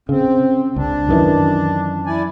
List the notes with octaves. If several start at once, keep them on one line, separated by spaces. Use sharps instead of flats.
C#3 C4
C#2 D4
F#2 D#3 E3
E4 D5 G#5